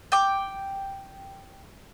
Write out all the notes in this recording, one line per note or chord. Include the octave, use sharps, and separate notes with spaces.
G5 D6